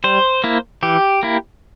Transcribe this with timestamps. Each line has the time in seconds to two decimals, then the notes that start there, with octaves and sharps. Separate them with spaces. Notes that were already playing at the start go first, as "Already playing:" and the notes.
0.04 G3 C5
0.44 A#3 E4
0.83 E3 G4
1.23 A#3 E4